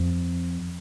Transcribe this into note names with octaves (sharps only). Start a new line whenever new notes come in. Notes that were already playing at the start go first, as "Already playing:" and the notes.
Already playing: F2